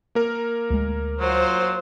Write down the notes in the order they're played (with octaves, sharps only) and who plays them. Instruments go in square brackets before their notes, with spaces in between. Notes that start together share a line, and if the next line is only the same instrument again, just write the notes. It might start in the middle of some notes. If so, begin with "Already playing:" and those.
[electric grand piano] A#3 A#4
[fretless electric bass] D2 G#3
[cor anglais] F#3 [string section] F4 C5